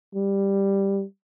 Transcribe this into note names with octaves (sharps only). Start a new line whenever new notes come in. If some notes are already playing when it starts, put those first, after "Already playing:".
G3